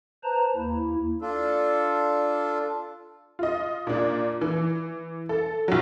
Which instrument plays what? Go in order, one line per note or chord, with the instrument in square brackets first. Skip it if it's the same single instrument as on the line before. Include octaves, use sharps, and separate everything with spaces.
[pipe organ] B4 C5 A5 A#5
D#2 A#3 E4
[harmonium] D4 F4 A4
[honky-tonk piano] F4 D#5
A#2 D4
E3
A4
A#1 F#3